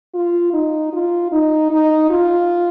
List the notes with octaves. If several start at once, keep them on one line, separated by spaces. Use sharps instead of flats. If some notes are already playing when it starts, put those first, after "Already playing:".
F4
D#4
F4
D#4
D#4
F4